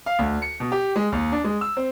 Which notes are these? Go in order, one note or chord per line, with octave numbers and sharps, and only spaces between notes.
F5
D2
C#7
B2
G4
G#3
D#2
D4
G#3
E6
C4